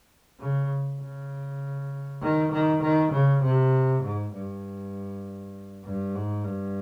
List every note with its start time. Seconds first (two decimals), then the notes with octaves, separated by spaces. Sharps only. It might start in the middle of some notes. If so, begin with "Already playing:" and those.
0.40 C#3
1.01 C#3
2.22 D#3
2.52 D#3
2.82 D#3
3.12 C#3
3.43 C3
4.03 G#2
4.33 G2
5.85 G2
6.15 G#2
6.45 G2